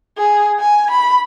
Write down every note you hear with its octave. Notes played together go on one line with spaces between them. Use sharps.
G#4
G#5
B5